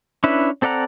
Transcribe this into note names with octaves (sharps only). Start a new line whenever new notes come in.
C#4 D4 E4 B4 E5
C4 A4 D5 F#5 A#5